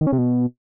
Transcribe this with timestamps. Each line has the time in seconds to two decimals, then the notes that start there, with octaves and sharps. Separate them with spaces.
0.01 D#3
0.07 C#4
0.13 C3
0.18 B2